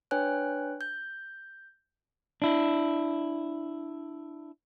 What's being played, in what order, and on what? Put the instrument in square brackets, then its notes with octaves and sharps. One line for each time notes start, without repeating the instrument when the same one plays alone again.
[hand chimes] D4 B4 C#5 G5 G#5 F#6
G6
[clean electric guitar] D4 E4